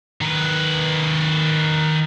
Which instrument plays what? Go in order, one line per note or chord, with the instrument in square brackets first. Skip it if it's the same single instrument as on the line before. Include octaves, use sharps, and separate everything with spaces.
[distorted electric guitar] D#3 B4